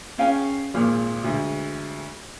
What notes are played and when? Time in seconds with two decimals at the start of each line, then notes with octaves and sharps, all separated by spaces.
0.18 C#4 G#4 F5 G5 G#5
0.74 G#1 A#2 G#4 F6
1.24 D2 G#3